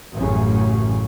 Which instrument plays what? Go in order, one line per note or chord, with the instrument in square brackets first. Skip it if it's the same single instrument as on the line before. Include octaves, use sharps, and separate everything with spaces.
[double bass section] A1 F#2 C#3